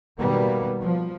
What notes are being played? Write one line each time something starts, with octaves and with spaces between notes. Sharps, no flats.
B2 D#3 G3 A#3 B3
F3